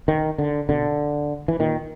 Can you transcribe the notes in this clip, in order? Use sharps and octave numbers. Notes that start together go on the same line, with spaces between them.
D#3
D3
B2 D3
E3
A#2 D#3